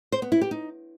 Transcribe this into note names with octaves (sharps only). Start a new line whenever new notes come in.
C5
B3
E4
G4
D#4